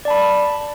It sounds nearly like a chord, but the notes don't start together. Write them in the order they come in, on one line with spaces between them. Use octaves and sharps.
D5 A5 B5